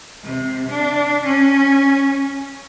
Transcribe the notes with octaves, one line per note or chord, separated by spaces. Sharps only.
C3
D4
C#4